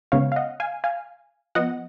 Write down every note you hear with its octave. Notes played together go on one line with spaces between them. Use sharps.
C#3 G#3 B3 C#5 F5
F5
D#5 F#5
F5 G#5
F5 G#5
F3 B3 D#5 F#5